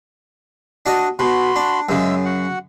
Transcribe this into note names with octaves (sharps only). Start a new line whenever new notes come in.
D4 F#4 D#5
B2 F#4 B5 C6
D4
F#2 C#3 G#3 E5 E6
F#4 F#5